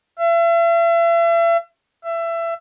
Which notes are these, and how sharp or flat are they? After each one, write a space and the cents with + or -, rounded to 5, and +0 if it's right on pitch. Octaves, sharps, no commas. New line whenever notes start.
E5 +40
E5 +25